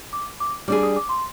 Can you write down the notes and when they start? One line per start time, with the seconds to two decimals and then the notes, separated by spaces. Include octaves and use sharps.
0.13 D6
0.40 D6
0.68 G3 D4 G#4 D6
0.83 D#6
0.96 D6
1.09 C6